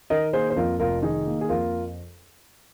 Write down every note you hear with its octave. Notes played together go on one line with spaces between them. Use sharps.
D#3 A#4 D#5
A#3 G#4 C5
C5
F2 F4 A#4
F1 F4 A#4
D#3 D#4 G#4
A#3
G#4
F2 F4 A#4